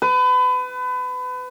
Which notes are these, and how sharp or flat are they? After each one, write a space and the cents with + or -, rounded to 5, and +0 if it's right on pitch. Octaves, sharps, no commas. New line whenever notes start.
B4 +30